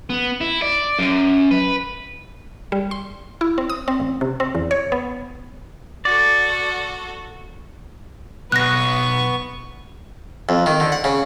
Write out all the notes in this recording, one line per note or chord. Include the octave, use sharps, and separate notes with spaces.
B3
E4
D5
F#2
B4
G3
C6
E4
C4
D#6
C4
A1
C3
C4
E2
C#5
B3
F#4 A4 D5
B1 B3 C#6 F#6 A#6
F2
D#3
D3
F#5
C#3